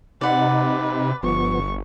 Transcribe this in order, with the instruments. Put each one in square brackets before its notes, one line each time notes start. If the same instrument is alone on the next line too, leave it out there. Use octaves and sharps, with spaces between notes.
[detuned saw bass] C3 [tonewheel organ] D#4 [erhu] B4 [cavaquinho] D5 F#5
[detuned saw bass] G1 [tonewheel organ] F3 B3 [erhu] C#6